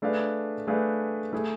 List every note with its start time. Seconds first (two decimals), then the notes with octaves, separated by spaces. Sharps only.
0.02 A3 D4 G#4 B4 F5
0.67 A3 D4 G#4 B4 F5
1.32 A3 E4 G#4